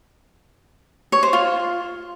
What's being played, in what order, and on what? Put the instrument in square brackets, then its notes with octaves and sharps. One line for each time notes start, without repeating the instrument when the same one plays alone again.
[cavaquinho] C#5
C5
F4